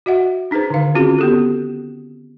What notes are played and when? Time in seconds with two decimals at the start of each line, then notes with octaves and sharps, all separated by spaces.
0.06 F#4 D#5 E5 F#5
0.51 D4 D#4 G#4 B4 C5
0.70 D3 D#3 F5
0.95 C4 C#4 F4 F#4 G#4
1.19 B3 G4 A4